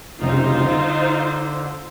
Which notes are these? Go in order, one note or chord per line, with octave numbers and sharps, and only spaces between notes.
F1 C2 C#3 D#4 F4 C5
D3